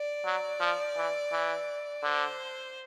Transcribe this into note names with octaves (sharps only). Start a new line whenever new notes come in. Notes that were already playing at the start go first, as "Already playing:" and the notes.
Already playing: D5
F#3
F3
E3
E3
D3 C5